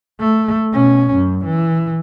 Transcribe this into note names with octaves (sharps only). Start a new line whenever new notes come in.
A3
B2 C#4
F#2
E3